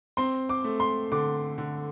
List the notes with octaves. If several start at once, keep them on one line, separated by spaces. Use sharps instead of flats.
C4 C6
D6
A3
C6
D3 D6
D3